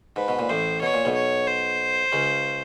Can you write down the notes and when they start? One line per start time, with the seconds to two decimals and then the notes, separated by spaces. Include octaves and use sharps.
0.16 G#2 B4
0.28 B2
0.39 A#2
0.49 A1 A2 C5
0.82 B2 C#5
0.94 A#2
1.05 B1 B2
1.15 C#5
1.47 C5
2.12 C#2 C#3